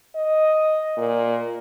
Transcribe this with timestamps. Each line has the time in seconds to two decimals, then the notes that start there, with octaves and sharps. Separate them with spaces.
0.15 D#5
0.97 A#2